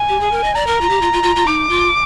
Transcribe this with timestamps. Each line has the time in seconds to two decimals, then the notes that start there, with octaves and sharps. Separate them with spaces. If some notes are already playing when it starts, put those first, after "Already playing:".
Already playing: G#5
0.09 G4
0.20 G#4
0.31 A#4
0.44 D#5
0.55 D5 A#5
0.67 A#4
0.81 F4
0.89 G4
1.01 F4
1.13 F4
1.23 F4
1.36 F4
1.47 D#4 D6
1.69 F4